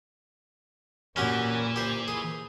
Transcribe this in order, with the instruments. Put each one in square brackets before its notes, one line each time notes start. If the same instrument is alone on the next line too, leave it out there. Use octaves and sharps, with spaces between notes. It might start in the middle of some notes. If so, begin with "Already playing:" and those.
[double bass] A#2 [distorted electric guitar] E3 [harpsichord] C#4 F#4 G4
[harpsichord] G4 C5
G#4